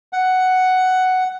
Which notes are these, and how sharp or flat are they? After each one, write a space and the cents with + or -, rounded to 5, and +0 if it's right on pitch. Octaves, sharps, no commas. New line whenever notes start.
F#5 +5